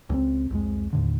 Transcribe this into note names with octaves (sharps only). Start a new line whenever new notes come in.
C#2 G#3 C4
C2 F2 G#3
D#2 A2 D3